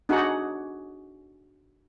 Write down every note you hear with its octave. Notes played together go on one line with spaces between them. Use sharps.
D4 D#4 F#4 G#4 F#5